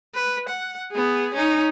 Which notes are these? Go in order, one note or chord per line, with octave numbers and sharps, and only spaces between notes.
B4
F#5
B3 G#4
C#4 D#4